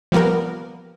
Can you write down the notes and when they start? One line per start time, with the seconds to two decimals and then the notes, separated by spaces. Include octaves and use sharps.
0.12 F3 G3 A#3 B3 A#4